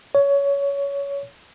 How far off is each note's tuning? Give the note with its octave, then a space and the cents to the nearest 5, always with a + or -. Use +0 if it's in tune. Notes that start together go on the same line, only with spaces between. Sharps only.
C#5 +20